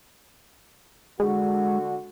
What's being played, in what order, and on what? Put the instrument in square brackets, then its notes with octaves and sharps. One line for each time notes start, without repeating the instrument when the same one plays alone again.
[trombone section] D3 F#4 [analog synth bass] G#3